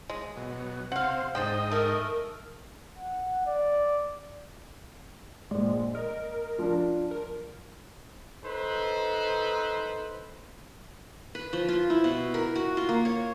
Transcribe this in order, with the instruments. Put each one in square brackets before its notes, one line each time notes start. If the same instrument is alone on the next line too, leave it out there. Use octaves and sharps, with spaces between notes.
[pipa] G#3
[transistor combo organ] B2 F#3
[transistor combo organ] C3 C4 [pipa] F5 F#5
[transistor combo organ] G#2 D#4 D#5 [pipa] D4 C5 G5
[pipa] A3 [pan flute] A#4
[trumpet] F#5
D5
[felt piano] A#1 D5 [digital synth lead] G#3
[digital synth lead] A#4 [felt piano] D#5
[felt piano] F3 D4
[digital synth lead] A#4
[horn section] D#4 A4 B4 C5
[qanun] B4
F3
F4
E4
B2
A#4
F#4
F4
A#3
C#5